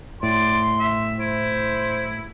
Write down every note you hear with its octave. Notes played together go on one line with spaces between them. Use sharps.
A2 D5 C6
E5
E4 C5